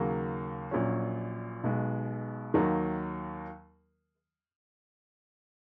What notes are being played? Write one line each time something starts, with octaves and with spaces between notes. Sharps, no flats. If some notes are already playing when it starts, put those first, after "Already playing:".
Already playing: D#2 C#3 F#3 A#3
A#1 A#2 F#3 C#4
B1 B2 G#3
D#2 D#3 F#3 A#3